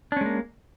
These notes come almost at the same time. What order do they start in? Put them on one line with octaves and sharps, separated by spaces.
D4 C#4 G#3 A#3